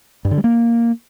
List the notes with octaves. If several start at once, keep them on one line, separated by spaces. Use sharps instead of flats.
G2
D3
G3
A#3